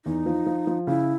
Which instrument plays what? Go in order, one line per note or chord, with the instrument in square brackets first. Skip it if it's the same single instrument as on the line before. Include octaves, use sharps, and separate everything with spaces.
[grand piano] E2 [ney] D#4
[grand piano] F3
F3
F3
[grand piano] C#3 [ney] E4